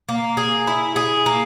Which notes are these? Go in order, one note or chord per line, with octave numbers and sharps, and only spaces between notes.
A#3
G#4
E4
G#4
A#3